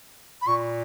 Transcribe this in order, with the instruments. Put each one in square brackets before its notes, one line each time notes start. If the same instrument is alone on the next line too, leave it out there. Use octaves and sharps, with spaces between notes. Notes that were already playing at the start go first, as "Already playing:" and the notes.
[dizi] B5
[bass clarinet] A#2 [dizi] C#6